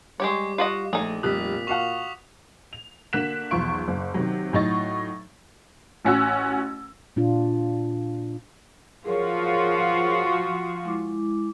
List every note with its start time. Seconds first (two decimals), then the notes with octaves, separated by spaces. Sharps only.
0.20 G3 G#3 G4 C#5 D6
0.58 F4 F#4 D#5
0.93 A#1 A3 D#4 G#4
1.23 F1 A#2 G3 D#6 F#6 B6
1.67 F#4 F5 F#5 C#6 F7
2.73 F7
3.13 D3 A#3 F#4 F#6 B6 E7
3.51 B1 E2 F3 C6 C#6 D7
3.88 F#1
4.14 C3 D#3 F#3
4.53 A2 F#3 D#4 C#6 A6
6.05 A1 C#4 F#4 E6
7.16 A#2 D4 F4
9.05 F3 F4 F#4 G#4 A#4 C#5
10.85 G#3 E4 D6